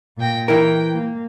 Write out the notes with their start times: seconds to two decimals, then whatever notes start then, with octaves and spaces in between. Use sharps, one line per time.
0.17 A#2 G5 A#6
0.48 E3 E4 A#4 G5
0.94 A#3